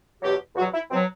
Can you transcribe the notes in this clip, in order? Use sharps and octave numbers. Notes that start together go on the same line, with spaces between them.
E2 B2 F#3 G4
E2 B2 F#3 F#4
E4
B2 F#3 C4